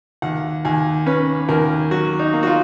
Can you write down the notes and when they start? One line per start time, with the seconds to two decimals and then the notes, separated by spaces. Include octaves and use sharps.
0.22 D#2 F#5
0.65 D#2 G#5
1.06 C#4 B4
1.49 D#2 A#4
1.91 F#3 F#4
2.19 D#4
2.33 A#3
2.43 F#4
2.47 F4